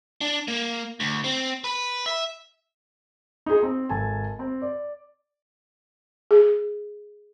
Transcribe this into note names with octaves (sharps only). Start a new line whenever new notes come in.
D4
A#3
D2
C4
B4
E5
D#4 F4 G#4
C4
G#1 A4 G#5 A5
C4
D5
G#4